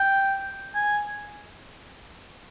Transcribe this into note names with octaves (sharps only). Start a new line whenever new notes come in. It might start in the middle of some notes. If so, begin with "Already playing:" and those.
Already playing: G5
G#5